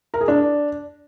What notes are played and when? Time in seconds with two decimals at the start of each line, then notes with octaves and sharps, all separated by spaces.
0.14 A#4
0.21 G#4
0.28 D4